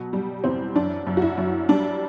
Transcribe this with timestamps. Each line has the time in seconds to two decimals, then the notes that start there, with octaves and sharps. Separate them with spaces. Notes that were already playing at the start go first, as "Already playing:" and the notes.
Already playing: B2 F#3
0.13 G3
0.44 E2 C4
0.76 F#2 D4
1.07 F#2
1.17 F#4
1.22 E4
1.38 F#2
1.69 G3 D4